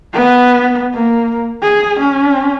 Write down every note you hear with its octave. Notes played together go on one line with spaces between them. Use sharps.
B3
A#3
G#4
C#4